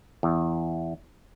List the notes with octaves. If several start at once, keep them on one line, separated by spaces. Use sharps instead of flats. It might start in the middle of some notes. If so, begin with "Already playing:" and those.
E2